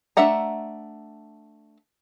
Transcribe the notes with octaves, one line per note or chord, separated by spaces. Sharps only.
A3 D4 E5 F#5 A#5